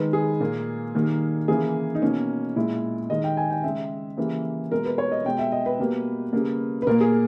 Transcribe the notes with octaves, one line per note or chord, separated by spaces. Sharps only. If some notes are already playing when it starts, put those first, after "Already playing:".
Already playing: D#3 G#3 B4
G#4
A#2 A#3
D#3 G3 A#3
C#3 E3 A#3 G#4
D#4
B2 A#3 C#4
A#2 G#3 E4
D#3 G#3 D#5
G5
G#5
G5
C#3 G#3 E5
C#3 E3 G3 A#3
B2 G#3 A#4
B4
C#5
D#5
B2 G#3 G5
E5
D#5
B4
B2 G3 A#3
C#3 G3 A#3
B4
A#2 A#3 A#4
G#4